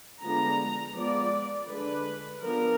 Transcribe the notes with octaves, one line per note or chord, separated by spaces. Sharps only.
D3 F3 G#3 B3 D4 A#5
F3 G#3 B3 D5
D3 G#3 D4 B4
F3 B3 D4 A#4